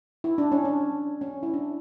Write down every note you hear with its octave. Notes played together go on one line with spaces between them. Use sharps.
E4
D4
C#4
D4
C#4
E4
D4